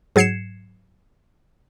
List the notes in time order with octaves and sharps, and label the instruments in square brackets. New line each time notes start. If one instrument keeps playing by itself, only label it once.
[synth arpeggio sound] G#2 F#3 G#6 C7 C#7 E7